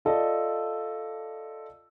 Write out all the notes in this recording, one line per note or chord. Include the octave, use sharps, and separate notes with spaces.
F4 A4 D5 D#5 A5